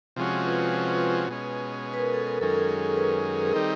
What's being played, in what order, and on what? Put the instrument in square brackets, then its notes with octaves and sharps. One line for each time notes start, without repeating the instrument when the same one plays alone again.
[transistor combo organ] C3 F3 G#3 C#4 F#4 [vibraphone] F4
[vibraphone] B4
B4
[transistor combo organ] B2 G#3 C#4
[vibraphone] B4
A#4
A4
A#4
[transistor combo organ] F#2 D#3 G#3 C#4 [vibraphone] A4
[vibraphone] A#4
A4
G#4
B4
A#4
B4
A#4
G#4
[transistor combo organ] D#3 G3 C4 D#4 [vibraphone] A4